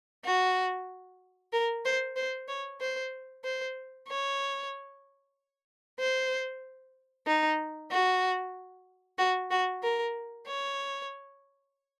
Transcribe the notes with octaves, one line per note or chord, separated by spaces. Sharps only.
F#4
A#4
C5
C5
C#5
C5
C5
C#5
C5
D#4
F#4
F#4
F#4
A#4
C#5